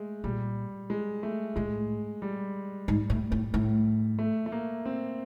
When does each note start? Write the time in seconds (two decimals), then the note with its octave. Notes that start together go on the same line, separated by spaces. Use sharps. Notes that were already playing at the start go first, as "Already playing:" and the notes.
Already playing: G#3 A3
0.24 A#2 G3
0.90 G#3
1.23 A3
1.56 A2 G#3
2.22 G3
2.88 G#2
3.10 A2
3.32 A2
3.54 A2
4.19 A3
4.46 A3
4.52 A#3
4.86 C4